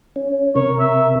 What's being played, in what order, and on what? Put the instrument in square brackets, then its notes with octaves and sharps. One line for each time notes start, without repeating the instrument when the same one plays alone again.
[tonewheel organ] C#4
[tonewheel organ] C3 A#4 [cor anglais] C#5
[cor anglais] E5